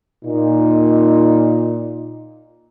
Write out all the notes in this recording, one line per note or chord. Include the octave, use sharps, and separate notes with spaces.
A#2 D#4